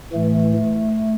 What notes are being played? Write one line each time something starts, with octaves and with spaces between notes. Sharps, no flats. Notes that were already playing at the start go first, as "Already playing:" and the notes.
A2 E3 A3